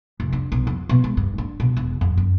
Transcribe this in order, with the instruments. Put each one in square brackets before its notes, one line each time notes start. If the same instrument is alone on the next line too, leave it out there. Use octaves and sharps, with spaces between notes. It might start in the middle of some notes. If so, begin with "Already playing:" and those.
[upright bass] F1
D4
B1
F2
B2
G#3
G2
D4
B2
E1
F2
F#2